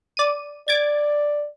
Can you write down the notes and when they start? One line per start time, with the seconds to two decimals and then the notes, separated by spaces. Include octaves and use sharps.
0.17 D5 D#7
0.68 D5 G#6 A6 D7